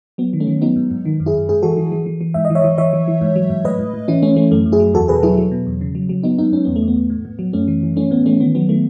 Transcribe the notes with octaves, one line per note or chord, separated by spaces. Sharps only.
F#3 B3
D#3
A3 C#4
D#3
F#3 B3 D#4
G#2
G#2
D#3
F#2
E4 G#4
F#2
G#2 E4 G#4
E3 F#4 A4
E3
E3
E3
E3
G#2 E5
D#5
E3
C#5 E5
E3
E3 C#5 E5
E3
E3
G#2
F#3
G#2
A2 B4 D#5
A2
A2
E3 C#4 E4
E3 A3 C#4
E3 A3 C#4
F#2 A3
F#2
E4 G#4
F#3
E2 F#4 A4
B2 G#4 B4
F#3 E4 G#4
F#3
B2
E2
C#3
F#3
F#3
F#3 B3 D#4
G#2 B3 D#4
G#2 C#4
E2 B3
A3
E2
B3
E2
A2
A2
F#3
F#2 A3 C#4
E3
E3
E3 A3 C#4
A2 B3
E3 A3 C#4
D#3 B3
F#3 B3
D#3 A3